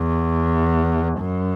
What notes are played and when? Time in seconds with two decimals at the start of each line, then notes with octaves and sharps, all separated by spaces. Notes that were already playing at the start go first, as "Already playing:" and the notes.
Already playing: E2
1.20 F#2